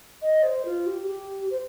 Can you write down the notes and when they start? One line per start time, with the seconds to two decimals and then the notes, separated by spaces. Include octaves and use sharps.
0.22 D#5
0.43 C5
0.65 F4
0.87 G4
1.08 G4
1.51 C5